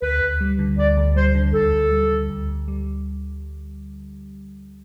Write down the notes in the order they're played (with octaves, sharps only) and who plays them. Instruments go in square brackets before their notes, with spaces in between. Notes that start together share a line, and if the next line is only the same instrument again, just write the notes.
[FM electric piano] D2 [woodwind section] B4
[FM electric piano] D2
G3
D3
[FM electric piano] D2 [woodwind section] D5
[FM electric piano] D2
[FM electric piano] G3 [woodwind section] C5
[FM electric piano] D3
[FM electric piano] D2 [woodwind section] A4
[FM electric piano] D2
G3
D3
D2
D2
G3